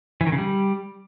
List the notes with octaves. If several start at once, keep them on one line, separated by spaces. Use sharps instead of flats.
E3
D#3
C#3
G3